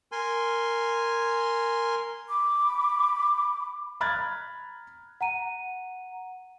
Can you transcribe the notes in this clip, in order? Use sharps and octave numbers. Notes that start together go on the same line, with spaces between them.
A#4 G#5 C6
B5 D6
A#5 B5 F6 F#6 G#6 A6
F#5 A#5 D#7